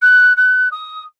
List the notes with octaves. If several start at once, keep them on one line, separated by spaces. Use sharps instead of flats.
F#6
F#6
D#6